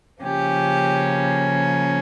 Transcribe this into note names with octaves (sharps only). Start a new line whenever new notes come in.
C#3 F3 A#3 C#4 G4